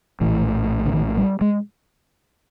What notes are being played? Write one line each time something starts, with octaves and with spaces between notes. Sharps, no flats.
A#1 A2 E3
D3
D#3
G3
G#3